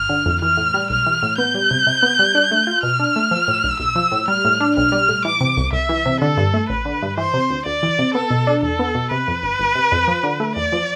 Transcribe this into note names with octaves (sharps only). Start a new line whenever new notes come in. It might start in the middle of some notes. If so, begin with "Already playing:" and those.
Already playing: G1 F6
D3
F2
E3 F6
A2
G3
B1 F6
E3
A2
B3 G6
G3
C3
C3
B3
G3
D4
A3
F4
B2 F6
D4
A3
F3
A2
B1
B1 E6
F3
A2
G3 F6
A2
D4
B1 F6
G3
A2
E3 D6
C3
C2
C2 E5
E3
C3
D3 A4
G2
A3
A1 B4
D3
G2
E3 C5
C3
D2
D2 D5
E3
C3
B3 A4
B2
D4
E2 A4
B3
B2
C3 B4
F2
G1
G1
C3
F2
F3
D3
A3
E2 D5
F3